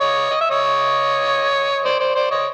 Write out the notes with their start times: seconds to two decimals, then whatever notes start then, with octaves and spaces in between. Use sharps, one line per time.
0.01 C#5 D#5
0.31 D#5
0.41 E5
0.51 C#5 D#5
1.85 C5 D5
1.99 C5 D5
2.15 C5 D5
2.31 C#5 D#5